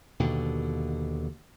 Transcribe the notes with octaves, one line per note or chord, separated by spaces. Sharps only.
D#2 B2 D3